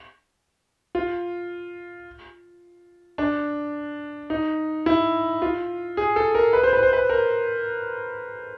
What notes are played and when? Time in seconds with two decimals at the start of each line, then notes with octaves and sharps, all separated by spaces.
0.95 F4
3.18 D4
4.30 D#4
4.86 E4
5.42 F4
5.97 G#4
6.16 A4
6.35 A#4
6.53 B4
6.63 C5
6.73 B4
6.83 C5
6.93 B4
7.10 A#4